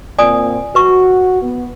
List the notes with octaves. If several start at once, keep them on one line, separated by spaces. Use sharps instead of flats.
A#2 C4 D5 G#5 D#6
F#4 B4 C#6
B3